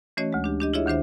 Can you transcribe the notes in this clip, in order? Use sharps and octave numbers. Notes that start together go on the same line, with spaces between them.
E3 A3 C#4 F#4 C#5 D#5
D2 G#3
D4 G4
D4 G4 D#5
E4 F4 G#4 C#5 D#5 E5
D2 D#3 D4 C5 E5